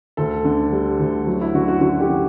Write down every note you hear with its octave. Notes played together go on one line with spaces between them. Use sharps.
D2 A4
D3
G3
D2
F#3
E4
D3 F#4
F#4
D3 F#4
G4
D3